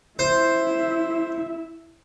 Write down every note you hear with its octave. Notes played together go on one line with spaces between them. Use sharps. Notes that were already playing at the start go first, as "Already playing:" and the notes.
E4 C5 E5